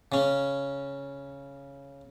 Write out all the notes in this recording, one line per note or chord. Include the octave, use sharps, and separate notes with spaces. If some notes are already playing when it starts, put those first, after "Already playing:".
C#3 C#4